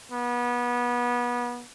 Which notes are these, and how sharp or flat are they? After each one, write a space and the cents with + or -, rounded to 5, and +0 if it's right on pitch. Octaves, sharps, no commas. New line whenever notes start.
B3 -25